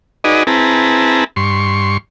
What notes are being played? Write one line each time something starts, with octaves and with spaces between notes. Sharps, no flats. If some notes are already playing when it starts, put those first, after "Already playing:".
D#4 F#4 G#4 B4 D5 D#5
C4 E4 G#4 B4 A5 A#5
G2 C6 C#6